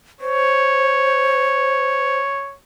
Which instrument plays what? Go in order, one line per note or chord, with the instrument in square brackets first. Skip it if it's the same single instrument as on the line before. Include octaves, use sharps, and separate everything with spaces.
[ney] C5 [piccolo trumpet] C#5